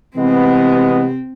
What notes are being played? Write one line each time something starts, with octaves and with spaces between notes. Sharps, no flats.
C3 E3 G#3 B3 C4